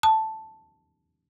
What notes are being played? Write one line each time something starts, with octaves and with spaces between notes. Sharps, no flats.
A5